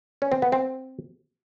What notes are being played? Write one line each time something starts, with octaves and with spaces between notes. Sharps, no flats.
C#4
C4
B3
C4